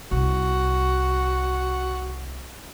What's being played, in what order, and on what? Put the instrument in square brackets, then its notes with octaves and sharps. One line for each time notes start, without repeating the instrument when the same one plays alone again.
[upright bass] C2 [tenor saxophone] F#4